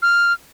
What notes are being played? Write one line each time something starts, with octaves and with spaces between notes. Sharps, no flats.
F6